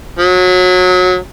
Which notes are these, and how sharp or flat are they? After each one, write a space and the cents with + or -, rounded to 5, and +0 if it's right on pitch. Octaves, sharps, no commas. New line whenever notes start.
F#3 -25